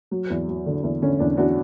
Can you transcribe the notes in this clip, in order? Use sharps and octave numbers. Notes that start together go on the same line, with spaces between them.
F#3
E2
F#3
D3
E2
D3 C#4
E2 D4
E2 D4 F#4